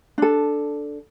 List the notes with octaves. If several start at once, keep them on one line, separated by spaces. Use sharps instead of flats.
D4 A4